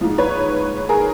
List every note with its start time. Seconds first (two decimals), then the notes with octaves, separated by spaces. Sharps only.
0.01 G#2 F3
0.18 B4 C#5
0.89 G#4 A#4